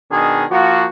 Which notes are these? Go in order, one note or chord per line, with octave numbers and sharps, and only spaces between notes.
B2 D#3 D4 G#4
F3 A#3 F#4